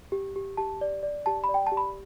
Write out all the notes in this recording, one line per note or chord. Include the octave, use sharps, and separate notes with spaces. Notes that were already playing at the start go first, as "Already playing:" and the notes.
G4
G4
G4 A5
D5
D5
G4 A5
B5
D5
G5
A5
G4
B5